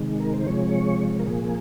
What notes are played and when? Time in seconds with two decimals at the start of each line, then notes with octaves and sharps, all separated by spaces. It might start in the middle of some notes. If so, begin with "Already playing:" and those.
Already playing: C3 D#3 G#3
0.20 A#4
0.34 C5
0.46 C3 F3 G#3 C#5
1.19 A#4
1.27 A#2 F3 A#3 G#4